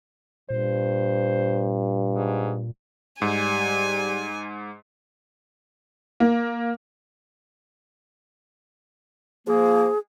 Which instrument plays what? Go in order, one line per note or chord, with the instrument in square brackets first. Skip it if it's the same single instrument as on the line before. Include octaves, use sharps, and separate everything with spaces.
[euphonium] G2 [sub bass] A#2 [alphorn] C5
[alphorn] G#2
[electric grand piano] G#2 [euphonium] G3 [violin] G#5
[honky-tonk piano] A#3
[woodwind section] F3 A#3 [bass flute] G#4